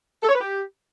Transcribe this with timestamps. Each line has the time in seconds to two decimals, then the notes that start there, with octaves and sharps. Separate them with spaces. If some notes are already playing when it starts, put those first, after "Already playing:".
0.23 A4
0.29 C#5
0.35 B4
0.41 G4